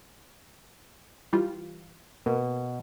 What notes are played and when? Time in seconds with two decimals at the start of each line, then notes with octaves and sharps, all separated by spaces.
1.33 E3 G3 F4
2.26 B2 A#3